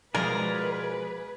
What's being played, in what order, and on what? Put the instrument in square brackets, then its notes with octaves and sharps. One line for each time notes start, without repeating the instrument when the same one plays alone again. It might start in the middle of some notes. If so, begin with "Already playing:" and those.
[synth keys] B2 F3 G#3 [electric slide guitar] G#4 D5 [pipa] A#4 [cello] B4